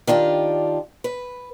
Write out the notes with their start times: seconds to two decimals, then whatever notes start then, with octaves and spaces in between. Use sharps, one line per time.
0.07 D#3 D4 F4 G4
1.04 B4